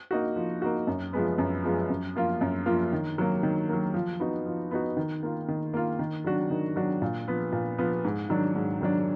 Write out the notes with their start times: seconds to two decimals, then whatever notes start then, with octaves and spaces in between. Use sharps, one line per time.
0.11 A#3 D#4 F#4
0.36 F3
0.62 A#3 D#4 F#4
0.87 F#2
1.13 F3 G#3 B3
1.38 F#2
1.64 F3 G#3 B3
1.90 F#2
2.16 F3 A#3 F4
2.41 F#2
2.66 F3 A#3 F4
2.92 D#3
3.18 F#3 A#3
3.43 D#3
3.69 F#3 A#3
3.94 F3
4.20 B3 D#4 F#4
4.46 F3
4.71 B3 D#4 F#4
4.97 D#3
5.23 A#3 F4
5.48 D#3
5.74 A#3 F4
5.99 D#3
6.24 F#3 D4 F#4
6.50 D#3
6.76 F#3 D4 F#4
7.02 A#2
7.27 F3 B3
7.52 A#2
7.78 F3 B3
8.04 G#2
8.29 D#3 F#3 D4
8.55 G#2
8.81 D#3 F#3 D4